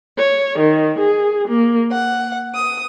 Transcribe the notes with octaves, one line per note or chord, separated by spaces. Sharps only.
C#5
D#3
G#4
A#3
F#5
D#6